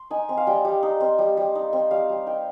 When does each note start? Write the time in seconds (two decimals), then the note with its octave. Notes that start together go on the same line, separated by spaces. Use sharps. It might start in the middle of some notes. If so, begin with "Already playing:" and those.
Already playing: C6
0.10 D#4 G#5
0.29 C4
0.37 F5
0.47 G3 G5
0.65 G3
0.83 D#4
1.00 C4
1.19 G3
1.37 G3
1.55 D#4
1.73 C4
1.91 G3 F5
2.09 G3
2.27 D#4 G5